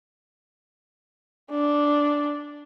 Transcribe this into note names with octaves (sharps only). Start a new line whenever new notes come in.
D4